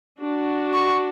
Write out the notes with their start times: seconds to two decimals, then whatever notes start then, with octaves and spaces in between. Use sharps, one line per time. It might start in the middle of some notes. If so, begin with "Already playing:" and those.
0.19 D4 F#4
0.74 C#6